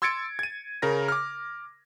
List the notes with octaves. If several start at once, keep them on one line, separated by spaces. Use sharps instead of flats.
C6 E6 G#6 A6 C#7 D7
G#6 D#7
C#3 A#4 A#6
D6 F6